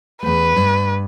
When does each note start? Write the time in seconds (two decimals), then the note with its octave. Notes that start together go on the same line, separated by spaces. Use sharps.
0.23 E2 A3 B4
0.56 G2